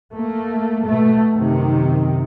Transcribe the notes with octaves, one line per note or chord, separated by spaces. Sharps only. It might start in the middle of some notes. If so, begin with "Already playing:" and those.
A3 A#3
B2 A3
F#2 C3 D#3